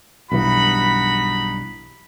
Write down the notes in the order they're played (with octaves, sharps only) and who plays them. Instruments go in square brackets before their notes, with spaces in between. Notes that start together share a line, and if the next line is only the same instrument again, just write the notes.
[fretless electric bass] B1 G2 E3 [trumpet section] D#4 F#4 B5